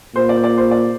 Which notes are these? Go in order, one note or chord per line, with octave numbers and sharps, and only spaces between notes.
A#2 C5
D5
C5
D5
C5
D5